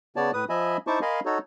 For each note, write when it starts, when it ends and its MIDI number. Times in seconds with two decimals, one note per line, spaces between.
0.16 0.31 49
0.16 0.31 59
0.16 0.31 73
0.16 0.31 74
0.16 0.31 81
0.33 0.45 45
0.33 0.45 71
0.33 0.45 87
0.49 0.77 53
0.49 0.77 75
0.49 0.77 76
0.49 0.77 80
0.49 0.77 83
0.87 0.99 63
0.87 0.99 64
0.87 0.99 72
0.87 0.99 81
0.87 0.99 85
0.87 0.99 86
1.02 1.20 70
1.02 1.20 75
1.02 1.20 77
1.02 1.20 80
1.02 1.20 83
1.02 1.20 84
1.25 1.38 63
1.25 1.38 66
1.25 1.38 69
1.25 1.38 73